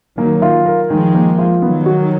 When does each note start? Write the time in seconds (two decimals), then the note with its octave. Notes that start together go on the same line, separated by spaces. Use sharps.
0.18 D#3 F#3 A#3
0.42 F4
0.66 A#4
0.90 D#3 F3 G#3
1.14 A#3
1.39 F4
1.62 D#3 F#3 B3
1.86 F#4